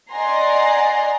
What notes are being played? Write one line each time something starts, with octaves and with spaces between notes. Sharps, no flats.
D5 D#5 F#5 G#5 A#5 C6